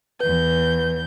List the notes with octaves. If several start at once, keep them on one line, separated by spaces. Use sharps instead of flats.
E2 B4 G6